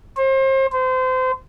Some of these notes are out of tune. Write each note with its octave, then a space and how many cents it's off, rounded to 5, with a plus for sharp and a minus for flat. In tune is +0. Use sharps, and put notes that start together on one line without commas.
C5 +35
C5 -30